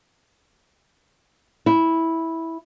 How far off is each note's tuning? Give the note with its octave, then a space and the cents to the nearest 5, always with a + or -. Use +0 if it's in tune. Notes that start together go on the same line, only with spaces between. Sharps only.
E4 -10